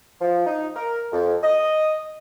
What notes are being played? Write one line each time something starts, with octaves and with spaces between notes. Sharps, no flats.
F3
D#4
A#4
F2
D#5